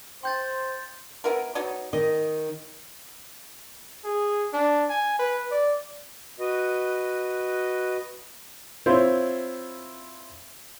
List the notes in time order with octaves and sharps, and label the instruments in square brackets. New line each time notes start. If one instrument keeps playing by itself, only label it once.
[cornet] C5 [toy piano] G5 [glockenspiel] C6 G6 A6
[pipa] B3 E4 A#4
F#3 B3 D#4
[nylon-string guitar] D#3 [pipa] D#5
[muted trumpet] G#4
D4
G#5
B4
D5
[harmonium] F#4 B4 D#5
[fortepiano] C4 E4 F4 C5 C#5